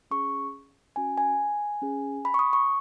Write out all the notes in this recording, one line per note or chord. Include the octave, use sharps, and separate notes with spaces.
C#4 G#4 C#6
C#4 F#4 G#5
G#5
C#4 G#4
B5
C#6
D#6
C#6